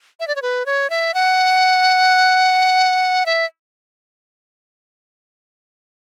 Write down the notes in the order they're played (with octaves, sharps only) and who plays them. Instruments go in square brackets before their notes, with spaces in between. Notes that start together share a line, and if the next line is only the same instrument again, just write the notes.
[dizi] E5
D5
C#5
B4
C#5
E5
F#5
E5